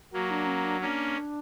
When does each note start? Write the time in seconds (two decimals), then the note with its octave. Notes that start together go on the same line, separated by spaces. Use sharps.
0.12 F#3 A#3 F#4
0.30 D4
0.46 C#4
0.64 D4
0.81 A#3 C#4 D4